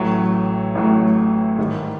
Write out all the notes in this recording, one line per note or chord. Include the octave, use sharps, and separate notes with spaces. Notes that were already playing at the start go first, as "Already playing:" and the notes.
Already playing: A1 A2 F#3 A3
A1 A2 F#3 A3
G#2 D#3 G3